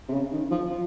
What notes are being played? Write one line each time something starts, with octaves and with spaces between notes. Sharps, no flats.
C3
C#3
D#3
F3
F3